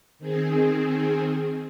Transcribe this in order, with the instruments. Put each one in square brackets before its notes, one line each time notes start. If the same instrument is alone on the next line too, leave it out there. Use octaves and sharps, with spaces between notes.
[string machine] D#3 C4 G#4